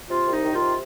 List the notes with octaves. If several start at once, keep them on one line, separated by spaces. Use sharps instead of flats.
C3 F4
C2
D#4
D#3
F4
C3